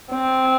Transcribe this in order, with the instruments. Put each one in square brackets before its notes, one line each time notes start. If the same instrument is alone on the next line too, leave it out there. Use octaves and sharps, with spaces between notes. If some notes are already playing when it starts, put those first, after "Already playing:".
[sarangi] C4